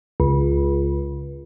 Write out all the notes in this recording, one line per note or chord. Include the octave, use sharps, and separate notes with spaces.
C#2